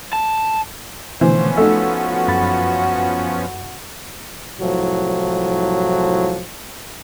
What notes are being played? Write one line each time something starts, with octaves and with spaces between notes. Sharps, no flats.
A5
B2 D3 E3 F3 A3 B3 C#4 C5
A3 D#4 F#4 A4 E6
F#2 B5 A6
C2 A2 F3 F#3